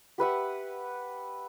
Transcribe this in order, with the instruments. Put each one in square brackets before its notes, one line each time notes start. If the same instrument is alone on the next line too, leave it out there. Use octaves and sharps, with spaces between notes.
[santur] G4 B4 E5 F#5